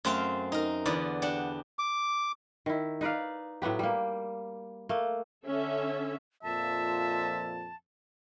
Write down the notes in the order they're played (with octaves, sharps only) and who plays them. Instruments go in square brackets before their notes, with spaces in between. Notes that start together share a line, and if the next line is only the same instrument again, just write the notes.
[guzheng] F#2 A3 C4 C5 F5 G5
D#4 A#4
E2 D3 B3 D5 B5
D4 G4 F#5
[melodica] D6
[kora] D#3 E4
D#4 B4 D5 F5
A2 F#3 B3 G4
G3 A#3
A3 A#3
[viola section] D3 C#4 A4 E5
[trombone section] F2 A#2 F3 [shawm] E5 [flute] A5